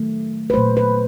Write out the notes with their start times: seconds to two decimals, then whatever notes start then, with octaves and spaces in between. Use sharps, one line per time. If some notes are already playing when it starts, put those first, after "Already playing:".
Already playing: D#3 F#3 A3
0.50 B4
0.53 A#2 F#3 A3 C5
0.77 B4